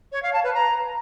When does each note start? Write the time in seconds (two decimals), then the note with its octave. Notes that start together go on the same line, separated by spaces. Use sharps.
0.12 C#5
0.23 F5
0.33 A5
0.44 B4
0.54 A#5